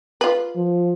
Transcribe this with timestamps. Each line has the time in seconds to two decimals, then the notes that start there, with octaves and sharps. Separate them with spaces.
0.21 F4 B4
0.56 F3